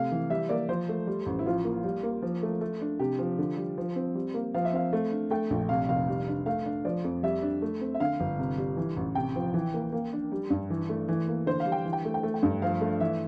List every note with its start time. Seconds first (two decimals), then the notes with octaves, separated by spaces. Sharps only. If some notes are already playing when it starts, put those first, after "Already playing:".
Already playing: C3 A3 F5
0.12 E3
0.30 G3 E5
0.49 A#3 D5
0.69 F3 C5
0.89 A3
1.07 G3
1.26 A1
1.39 E4
1.46 F3 F4
1.65 A#3
1.84 G3
2.03 A#3
2.22 F3
2.43 A3
2.61 A3
2.81 D4
2.99 C3 G4
3.19 F3
3.38 D3
3.57 G3
3.78 F3
3.96 C4
4.15 G3
4.34 A#3
4.54 F3 F5
4.65 E5
4.73 C4 F5
4.93 A3
5.11 D4
5.31 A3 G5
5.50 A#1
5.69 C3 F5
5.89 F1 F5
6.08 G3
6.28 D4
6.46 A3 F5
6.65 D4
6.85 F3 D5
7.04 F2
7.23 G3 E5
7.42 D4
7.62 A3
7.81 C4
7.94 E5
8.00 D3 F5
8.20 G1
8.39 C3
8.58 G3
8.77 E3
8.97 A1
9.15 C3 G5
9.36 F3
9.54 E3
9.74 A#3
9.92 A#3
10.13 D4
10.32 G3
10.50 G2
10.70 E3
10.89 A3
11.09 E3
11.28 A#3
11.46 D3 C5
11.60 F5
11.66 G3
11.72 G5
11.85 E3
11.93 G5
12.05 A3
12.14 G5
12.23 A3
12.34 G5
12.43 G2
12.62 F3 F5
12.81 A3
13.00 E3 E5